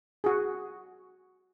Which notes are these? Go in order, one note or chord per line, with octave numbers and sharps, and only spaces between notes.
F#4 G#4